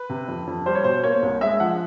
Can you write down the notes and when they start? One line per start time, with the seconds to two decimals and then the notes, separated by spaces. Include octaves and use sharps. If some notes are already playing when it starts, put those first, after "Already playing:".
Already playing: B4
0.10 C3
0.28 F2
0.47 F2
0.66 G3 C5
0.75 C#5
0.84 B2 C5
1.04 A#3 C#5
1.23 C2
1.41 G#3 E5
1.60 F3 F#5